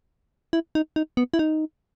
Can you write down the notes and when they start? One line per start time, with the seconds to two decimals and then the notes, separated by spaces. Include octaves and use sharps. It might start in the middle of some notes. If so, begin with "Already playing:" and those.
0.53 E4
0.75 D#4
0.96 D#4
1.17 B3
1.34 E4
1.39 D#4